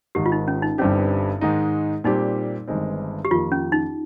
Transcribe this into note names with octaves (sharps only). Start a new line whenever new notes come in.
G#1 G#2 D#3 G4
F4
D#4
C#4
D#4
G1 G2 G3 C4 C#4 G4
G#2 D#3 G#3 D#4
A#2 G3 C4 D#4 G4
G1 G2 D#3 G#3 C4
G4
F2 D#3 A#3 F4
C#4
D#4